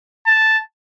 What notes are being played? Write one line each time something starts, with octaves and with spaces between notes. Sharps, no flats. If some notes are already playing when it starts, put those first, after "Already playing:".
A5